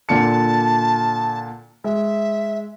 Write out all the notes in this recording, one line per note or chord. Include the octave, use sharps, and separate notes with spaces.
A#2 D3 A5 C#7
G#3 E5